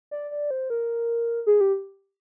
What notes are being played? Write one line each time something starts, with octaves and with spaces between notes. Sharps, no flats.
D5
D5
C5
A#4
G#4
G4